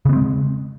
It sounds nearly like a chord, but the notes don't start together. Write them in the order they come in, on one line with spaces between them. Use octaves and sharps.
C#3 B3 C4 G#3